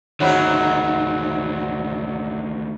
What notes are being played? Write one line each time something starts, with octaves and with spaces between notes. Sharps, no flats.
D2 G#2 D#3 F#3 E4